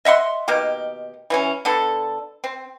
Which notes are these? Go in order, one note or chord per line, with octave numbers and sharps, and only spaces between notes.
D#5 E5 F#5 C6
B2 D#3 A#3 G4
E3 F#3 C#4
D3 B3 A4
C4